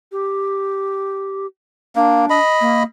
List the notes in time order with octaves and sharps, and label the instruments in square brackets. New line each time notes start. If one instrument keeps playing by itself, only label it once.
[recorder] G4
[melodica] A#3 [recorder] D4
[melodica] D#5 B5
[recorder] A#3